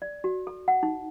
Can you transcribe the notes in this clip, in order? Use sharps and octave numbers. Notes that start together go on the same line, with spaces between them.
D5
F#4
A4
F#5
D#4